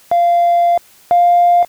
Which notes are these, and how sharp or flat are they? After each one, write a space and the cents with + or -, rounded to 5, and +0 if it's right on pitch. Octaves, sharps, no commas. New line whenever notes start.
F5 -15
F5 +5